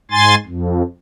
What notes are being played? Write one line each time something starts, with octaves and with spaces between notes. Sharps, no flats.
G#2 G#5 C6 A6
F2